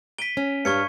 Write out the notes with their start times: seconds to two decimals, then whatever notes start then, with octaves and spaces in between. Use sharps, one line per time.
0.18 B6 D7 D#7 G7
0.37 C#4
0.65 G2 G3 C#5 F5 C#6 G#6 C#7